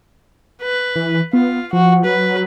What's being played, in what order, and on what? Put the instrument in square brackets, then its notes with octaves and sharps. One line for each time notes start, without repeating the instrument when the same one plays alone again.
[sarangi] B4
[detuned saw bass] E3
[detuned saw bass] B3 [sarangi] F4
[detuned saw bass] F3 [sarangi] F#4
[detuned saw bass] F#3 [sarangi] B4